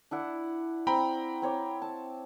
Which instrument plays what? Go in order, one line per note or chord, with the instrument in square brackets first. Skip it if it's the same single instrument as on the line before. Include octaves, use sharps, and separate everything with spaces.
[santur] D4 E4 F#5
[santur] C4 [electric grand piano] G5 A#5 B5
[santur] C4 C#5 D6
A5